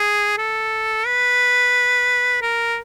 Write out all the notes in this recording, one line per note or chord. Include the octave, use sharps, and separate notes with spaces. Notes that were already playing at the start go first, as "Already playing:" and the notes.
Already playing: G#4
A4
B4
A#4